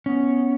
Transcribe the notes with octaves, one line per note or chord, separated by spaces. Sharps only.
B3 C#4